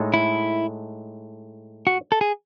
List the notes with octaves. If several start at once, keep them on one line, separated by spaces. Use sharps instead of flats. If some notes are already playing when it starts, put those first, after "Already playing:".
Already playing: A2 G#3 D#4 A4
E4
F#4
A4
G#4